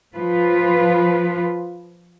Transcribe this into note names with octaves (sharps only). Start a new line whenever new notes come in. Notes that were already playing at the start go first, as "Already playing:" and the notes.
F3 F4 B4